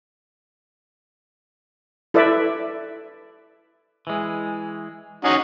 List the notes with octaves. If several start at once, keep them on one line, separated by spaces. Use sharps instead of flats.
E4 A4 B4 D5 E5
E3 G#3
C#4 D#4 F#4 G#4